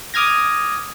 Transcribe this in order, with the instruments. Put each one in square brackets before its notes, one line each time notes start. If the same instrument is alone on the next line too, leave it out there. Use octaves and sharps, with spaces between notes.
[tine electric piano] D6 D#6 F6 G#6 A#6